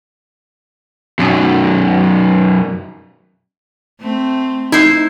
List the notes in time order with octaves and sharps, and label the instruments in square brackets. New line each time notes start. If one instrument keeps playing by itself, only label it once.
[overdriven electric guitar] B1 F#2
[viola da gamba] A3 C4
[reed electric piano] D#4 [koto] E4 C5